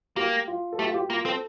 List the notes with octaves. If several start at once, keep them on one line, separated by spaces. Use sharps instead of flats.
A#3 G4
F4
A4
A3 G4
F4
G4
A#3 F4
C4 A4